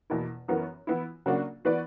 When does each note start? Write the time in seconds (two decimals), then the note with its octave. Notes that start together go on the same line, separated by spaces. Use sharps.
0.10 E2 B2 A#3 E4
0.48 F#2 E3 B3 F#4 A#4
0.87 E3 B3 E4
1.26 C#3 F#3 A#3 D4 F#4
1.65 E3 B3 F#4 B4 D5